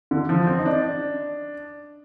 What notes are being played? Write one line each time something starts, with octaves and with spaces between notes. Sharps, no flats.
D3
F3
C4
D#4
D4